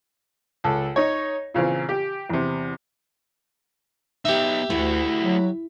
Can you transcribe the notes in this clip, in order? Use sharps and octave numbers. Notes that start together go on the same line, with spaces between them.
C#2 A4
D#4 C#5
A#2 C#3 E3 C4
G4
E2 C3
B3 D#4 G4 E5
D2 A3 E4 F#4
F#3